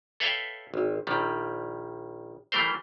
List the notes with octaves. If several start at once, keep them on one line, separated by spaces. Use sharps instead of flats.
A4 B4 C#5 E5 F5 G5
G#1
A#1 D#3 G3
E3 G3 A3 A#4 C5